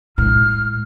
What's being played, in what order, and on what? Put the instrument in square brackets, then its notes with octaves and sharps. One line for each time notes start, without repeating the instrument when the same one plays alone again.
[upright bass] A2 G#3 [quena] F6